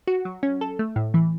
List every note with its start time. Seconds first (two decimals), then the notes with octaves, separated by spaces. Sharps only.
0.07 F#4
0.25 F#3
0.43 C#4
0.61 A4
0.79 A3
0.96 A2
1.14 E3